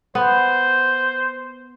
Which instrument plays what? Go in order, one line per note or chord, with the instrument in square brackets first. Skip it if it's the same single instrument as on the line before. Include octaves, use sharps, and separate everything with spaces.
[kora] B3 [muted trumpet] C5